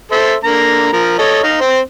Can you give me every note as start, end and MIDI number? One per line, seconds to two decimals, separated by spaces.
0.12 0.34 69
0.12 0.34 72
0.12 0.34 76
0.44 0.91 50
0.44 0.91 58
0.44 0.91 82
0.93 1.15 53
0.93 1.15 70
1.19 1.42 69
1.19 1.42 73
1.19 1.42 75
1.43 1.57 63
1.43 1.57 77
1.61 1.79 60
1.61 1.79 72